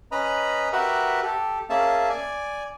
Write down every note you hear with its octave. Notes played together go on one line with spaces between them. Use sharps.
C#4 B4 D#5 A#5 B5
F#4 G4 A#4 B4 E5 F#5
G4 A4
A#3 C#4 G#4 E5 A5
D5 G#5